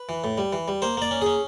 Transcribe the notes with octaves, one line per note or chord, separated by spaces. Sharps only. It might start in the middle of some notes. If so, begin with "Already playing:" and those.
Already playing: B4
E3
A2
G3
E3
G3
A#3 C5
A#3 D5
C#4
C#4 G#4